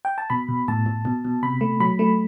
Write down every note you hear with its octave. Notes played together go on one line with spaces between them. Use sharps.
G5
A5
B2 B5
B2
A2 A5
A2
B2
B2
C3 B5
A3
F#3 B5
A3